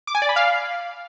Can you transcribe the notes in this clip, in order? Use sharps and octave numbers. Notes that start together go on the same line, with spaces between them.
D6
G#5
D5
B5
F5